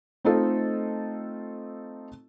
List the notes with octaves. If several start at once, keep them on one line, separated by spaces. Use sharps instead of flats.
A3 C4 D#4 F4 A4 D#5